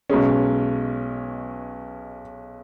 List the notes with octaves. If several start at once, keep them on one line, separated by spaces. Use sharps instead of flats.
B1 B2 G#3 C#4